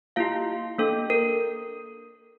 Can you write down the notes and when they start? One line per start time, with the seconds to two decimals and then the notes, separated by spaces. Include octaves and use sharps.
0.16 A#3 E4 F4 G4 F5
0.79 A#3 D4 A4
1.10 A#4